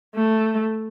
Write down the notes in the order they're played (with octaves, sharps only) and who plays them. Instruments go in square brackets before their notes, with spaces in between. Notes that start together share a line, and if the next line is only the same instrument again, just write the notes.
[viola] A3